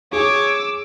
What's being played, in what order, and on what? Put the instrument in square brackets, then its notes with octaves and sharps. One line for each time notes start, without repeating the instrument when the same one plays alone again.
[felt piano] G#4 [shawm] C#5 [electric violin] D6 E6